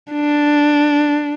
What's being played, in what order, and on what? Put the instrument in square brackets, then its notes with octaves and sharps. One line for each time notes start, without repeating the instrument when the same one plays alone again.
[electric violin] D4